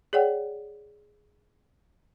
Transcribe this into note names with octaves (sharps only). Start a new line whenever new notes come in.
G#4 C#5 D5 F#5 G5